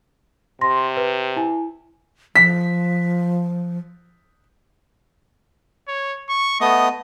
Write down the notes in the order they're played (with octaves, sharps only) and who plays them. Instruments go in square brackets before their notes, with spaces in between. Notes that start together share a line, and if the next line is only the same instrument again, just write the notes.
[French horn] C3 [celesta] C6 A#6
[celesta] B4
E4 G#5
[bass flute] F3 [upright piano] B6
[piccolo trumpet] C#5
C#6
[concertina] A3 B3 D#6 [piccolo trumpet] D#5